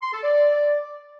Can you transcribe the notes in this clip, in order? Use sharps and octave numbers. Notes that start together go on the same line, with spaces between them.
C6
A4
D5